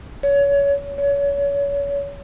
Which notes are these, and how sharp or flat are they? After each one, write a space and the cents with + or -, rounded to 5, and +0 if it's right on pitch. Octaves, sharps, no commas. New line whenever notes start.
C#5 +25
C#5 +30